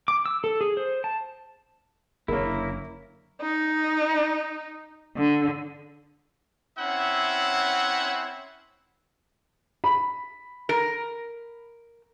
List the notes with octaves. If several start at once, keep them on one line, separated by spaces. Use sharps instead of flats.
D6
E6
A4
G#4
C5
A5
F#1 F#2 D3 A#3 E4 A#4 C#5
D#4
D3
C4 C#4 E4 E5 F#5
B5
A#4